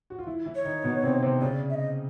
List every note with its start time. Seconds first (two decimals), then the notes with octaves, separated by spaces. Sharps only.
0.10 F#4
0.19 F4
0.26 E3 E4
0.46 E3 E4
0.55 C#5
0.65 D#3 D#4
0.84 B2 B3
1.03 C3 C4
1.22 C3 C4
1.41 C#3 C#4 D5
1.69 E5
1.74 D#5